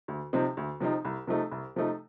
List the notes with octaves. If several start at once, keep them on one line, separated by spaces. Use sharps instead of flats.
D2
C3 F3 C4 D#4
D2
C3 F3 C4 D#4
C2
C3 F3 A3 D#4
C2
C3 F3 A3 D#4